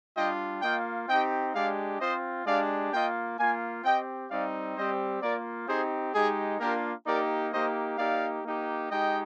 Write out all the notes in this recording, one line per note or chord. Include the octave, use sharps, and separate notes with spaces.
G3 D4 F4 D#5 G5
A#3 F4 D#5 G5
C4 D#4 G4 D#5 G5
G#3 D4 G4 D5 F5
C4 F4 C5 D#5
G#3 D4 G4 D5 F5
A#3 F4 D#5 G5
A#3 F4 F5 G#5
C4 G4 D#5 G5
G3 C4 D#4 D5 F5
G3 C4 G4 C5 D#5
A#3 F4 A#4 D5
C4 D#4 G4 G#4 C5
G#3 D#4 G4 G#4
A#3 D4 F4 G4 A#4
A#3 D#4 G4 A#4 D5
A#3 D#4 G4 C5 D#5
A#3 D#4 G4 D5 F5
A#3 D#4 G4
G#3 D#4 G4 D#5 G5